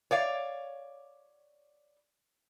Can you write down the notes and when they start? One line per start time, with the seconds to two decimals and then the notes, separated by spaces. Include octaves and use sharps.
0.11 C#5 D5 F5